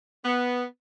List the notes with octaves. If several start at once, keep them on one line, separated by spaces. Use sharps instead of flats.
B3